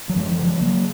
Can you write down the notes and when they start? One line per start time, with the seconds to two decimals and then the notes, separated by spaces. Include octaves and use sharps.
0.09 F#3
0.16 F#2 F3 G#3
0.32 F3
0.38 C#3
0.46 F3 G#3
0.61 C#3 F#3 A#3